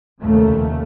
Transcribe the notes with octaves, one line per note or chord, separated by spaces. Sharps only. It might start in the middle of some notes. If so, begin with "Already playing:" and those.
F1 D#2 C#3 A3